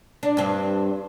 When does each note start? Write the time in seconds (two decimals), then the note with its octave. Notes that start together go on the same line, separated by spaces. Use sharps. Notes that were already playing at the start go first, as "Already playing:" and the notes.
0.23 D4
0.37 G2 C4